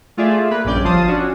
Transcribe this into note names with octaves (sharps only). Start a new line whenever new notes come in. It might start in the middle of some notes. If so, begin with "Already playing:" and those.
A3 F4 G#4 D5 E5
A#3 B4
A#1 G2 C#4 D5 G6
G1 F3 F4 F5 A5 D#6
C#4 D4 F#4